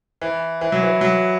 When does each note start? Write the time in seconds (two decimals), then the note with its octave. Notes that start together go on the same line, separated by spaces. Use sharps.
0.22 E3
0.61 E3
0.72 F#3
0.83 E3
1.01 F#3